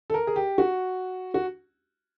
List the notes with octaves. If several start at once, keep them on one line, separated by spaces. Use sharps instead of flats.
A4
A#4
G#4
G4
F#4
F#4